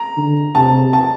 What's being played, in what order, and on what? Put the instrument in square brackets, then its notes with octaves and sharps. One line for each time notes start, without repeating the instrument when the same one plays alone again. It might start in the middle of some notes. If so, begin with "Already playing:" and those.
Already playing: [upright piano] A#5
[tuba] D3
[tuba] C3 [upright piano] A5
[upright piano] A5